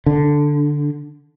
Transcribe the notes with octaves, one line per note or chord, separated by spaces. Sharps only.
D3